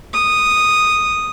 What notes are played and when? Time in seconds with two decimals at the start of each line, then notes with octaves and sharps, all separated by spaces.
0.13 D#6